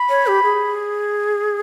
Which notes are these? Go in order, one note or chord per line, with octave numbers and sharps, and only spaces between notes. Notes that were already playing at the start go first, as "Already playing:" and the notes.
Already playing: B5
C#5
G4
G#4